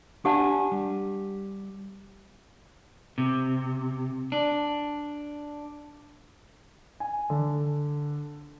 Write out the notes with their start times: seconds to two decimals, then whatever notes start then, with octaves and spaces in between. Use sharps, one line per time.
0.25 D4 G4 F#5 G#5 A5
0.72 G3
3.18 C3
4.32 D4
7.00 G#5
7.30 D3